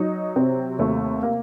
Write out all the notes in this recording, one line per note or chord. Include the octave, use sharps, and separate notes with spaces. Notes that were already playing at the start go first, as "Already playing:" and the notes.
Already playing: F#3 D#4
C3 C4
D#2 A3
A#3